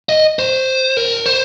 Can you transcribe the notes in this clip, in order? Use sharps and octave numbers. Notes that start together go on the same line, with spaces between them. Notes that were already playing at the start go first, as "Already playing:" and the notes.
D#5
C5
A#4
C5